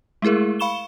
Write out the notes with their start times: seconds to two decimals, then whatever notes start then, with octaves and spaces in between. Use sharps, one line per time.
0.22 G#3 A3 E4 G#4 A#4
0.59 F5 B5 C#6 E7 G7